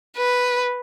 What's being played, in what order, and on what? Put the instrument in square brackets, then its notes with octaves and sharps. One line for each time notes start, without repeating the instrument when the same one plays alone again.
[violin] B4